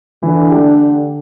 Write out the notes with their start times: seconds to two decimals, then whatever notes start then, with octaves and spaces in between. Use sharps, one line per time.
0.23 D3 E3
0.51 A3 D4 G4